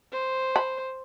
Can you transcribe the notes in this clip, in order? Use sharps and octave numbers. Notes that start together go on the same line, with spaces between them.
C5
B5